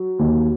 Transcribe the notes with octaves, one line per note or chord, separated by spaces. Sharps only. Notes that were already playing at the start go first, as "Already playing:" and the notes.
Already playing: F#3
D#2